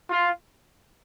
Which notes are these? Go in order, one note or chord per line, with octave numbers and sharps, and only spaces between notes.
F4